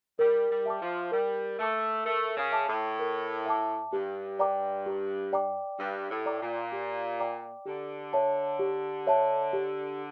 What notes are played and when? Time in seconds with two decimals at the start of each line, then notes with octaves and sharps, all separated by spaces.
0.19 G3 A#4
0.50 G3
0.66 E5 A5 D6
0.81 F3
1.12 G3 A#4
1.59 A3 E5 A5 D6
2.05 A3 A#4
2.37 C#3
2.52 E5 A5 D6
2.68 A2
2.99 A#4
3.46 E5 A5 D6
3.93 G2 G4
4.39 D5 G5 A#5 D6
4.86 G4
5.33 D5 G5 A#5 D6
5.79 G2 G4
6.10 A2
6.26 D5 G5 A#5 D6
6.42 A#2
6.72 G4
7.20 D5 G5 A#5 D6
7.66 D3 G4
8.13 C#5 E5 A5
8.59 G4
9.07 C#5 E5 A5
9.53 G4